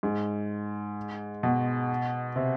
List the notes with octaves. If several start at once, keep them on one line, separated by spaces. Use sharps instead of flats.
G#2
B2
C3